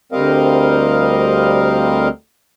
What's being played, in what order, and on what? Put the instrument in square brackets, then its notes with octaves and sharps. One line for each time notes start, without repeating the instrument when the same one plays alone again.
[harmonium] D2 G3 C4 A#4 D#5 F5